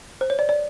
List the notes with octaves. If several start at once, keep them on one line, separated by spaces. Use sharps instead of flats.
C5
C#5
D5
D5